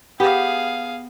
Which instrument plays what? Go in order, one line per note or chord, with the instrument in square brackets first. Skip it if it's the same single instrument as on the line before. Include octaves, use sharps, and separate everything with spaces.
[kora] B3 G4 [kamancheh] G#4 F5